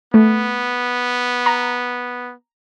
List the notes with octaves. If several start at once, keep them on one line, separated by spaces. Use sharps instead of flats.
A3 B3
A#5